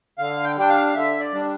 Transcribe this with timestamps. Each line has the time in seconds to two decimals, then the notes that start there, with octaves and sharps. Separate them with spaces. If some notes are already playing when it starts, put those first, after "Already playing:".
0.18 D3 F5
0.44 G5
0.57 G3 D4 G5
0.69 F5
0.94 D3 E5
1.20 D5
1.33 G3 D4